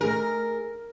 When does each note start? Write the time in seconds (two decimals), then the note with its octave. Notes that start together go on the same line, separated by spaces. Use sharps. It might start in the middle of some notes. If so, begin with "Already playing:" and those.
0.01 A3 D#4 G#4 A#4